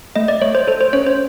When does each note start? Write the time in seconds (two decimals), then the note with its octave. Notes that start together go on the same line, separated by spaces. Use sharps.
0.16 A3 D#5
0.28 D5
0.41 A3 C#5
0.55 C5
0.67 A4 C5
0.81 C5
0.93 C#4 C#5
1.07 C5